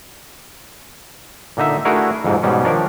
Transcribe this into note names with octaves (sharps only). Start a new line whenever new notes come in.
A#2 D3 D#4 E5
A3 D4 E4 F#4 G#4 A#4
F2 G#2 C3
G#2 B2 G3 C#4
D#3 F3 D4 A#4 C#5 D5